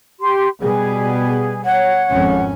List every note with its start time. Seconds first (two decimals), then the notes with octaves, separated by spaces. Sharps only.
0.20 G4 C6
0.60 B2 G3 B3 G#4
1.65 C#5 F#5
2.10 G#1 F2 C#4